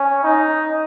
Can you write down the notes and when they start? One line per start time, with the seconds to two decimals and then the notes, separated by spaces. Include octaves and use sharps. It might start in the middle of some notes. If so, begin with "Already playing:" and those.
Already playing: C#4
0.23 D#4